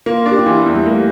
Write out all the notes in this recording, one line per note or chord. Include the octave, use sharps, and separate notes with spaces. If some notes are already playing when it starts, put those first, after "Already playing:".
A#3 F4
D4
G4
F4
E3 E4
E2
G3
A3 A#3